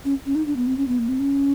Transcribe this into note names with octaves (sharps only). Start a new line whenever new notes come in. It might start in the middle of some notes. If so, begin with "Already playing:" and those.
C#4
C#4
D#4
D4
B3
C4
C#4
B3
A#3
C4
C#4